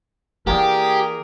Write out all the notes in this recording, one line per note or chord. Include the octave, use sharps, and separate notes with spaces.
E3 A#3 G4 G#4 A#4 D5 G5